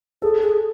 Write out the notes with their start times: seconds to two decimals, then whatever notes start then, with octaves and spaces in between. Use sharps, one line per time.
0.22 G#4 A4
0.43 G#4